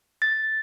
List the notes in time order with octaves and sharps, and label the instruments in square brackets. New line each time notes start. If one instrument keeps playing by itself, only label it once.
[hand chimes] A6